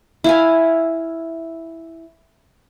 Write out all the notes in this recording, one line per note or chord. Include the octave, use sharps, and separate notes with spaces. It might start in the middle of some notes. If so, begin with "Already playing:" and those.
E4 F5 G#5